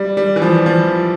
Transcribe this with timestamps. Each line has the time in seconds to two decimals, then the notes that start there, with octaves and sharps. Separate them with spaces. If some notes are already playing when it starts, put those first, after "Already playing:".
Already playing: G3
0.17 G3
0.36 E3
0.42 F3
0.66 F3